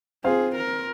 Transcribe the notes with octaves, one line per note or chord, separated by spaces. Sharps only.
C4 F4 G#4 C5 F5
A#4